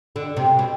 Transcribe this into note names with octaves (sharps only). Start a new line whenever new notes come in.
D3
C3
B2